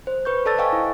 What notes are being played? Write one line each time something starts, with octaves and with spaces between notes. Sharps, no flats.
C5
B4 C#6 G6
A4 C5 D5 A5 E6 A6
D#5 F5 G5 G#5 C#6 E6
E4